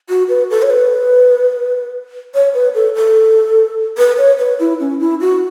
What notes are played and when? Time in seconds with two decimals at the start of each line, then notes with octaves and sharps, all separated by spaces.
0.09 F#4
0.29 B4
0.50 A4
0.62 C#5
0.70 B4
2.34 C#5
2.54 B4
2.74 A4
2.95 A4
3.98 B4
4.18 C#5
4.39 B4
4.59 E4
4.80 C#4
5.00 E4
5.21 F#4